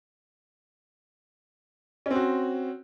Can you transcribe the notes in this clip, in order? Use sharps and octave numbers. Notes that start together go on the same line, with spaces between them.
C4 C#4 F#4